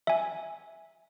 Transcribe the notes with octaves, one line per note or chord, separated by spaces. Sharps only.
E5 G#5